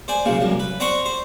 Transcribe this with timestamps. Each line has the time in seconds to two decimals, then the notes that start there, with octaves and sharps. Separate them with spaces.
0.08 C5 D5 G#5
0.26 B1 C#3 A#3
0.41 C2 F#2
0.59 B4
0.80 C5 D5 F#5 A#5 C6 C#6
1.06 C5